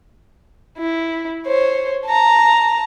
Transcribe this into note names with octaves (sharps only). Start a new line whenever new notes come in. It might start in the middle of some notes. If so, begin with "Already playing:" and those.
E4
C5 C#5
A5 A#5